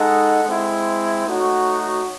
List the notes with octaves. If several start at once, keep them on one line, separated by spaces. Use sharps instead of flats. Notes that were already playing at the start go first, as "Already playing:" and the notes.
Already playing: G#3 D#4 A4 D#5 F#5
G#3 C4 E4
A3 D#4 F#4 C#5